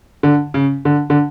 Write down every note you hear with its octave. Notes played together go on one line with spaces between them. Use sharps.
D3
C#3
D3
D3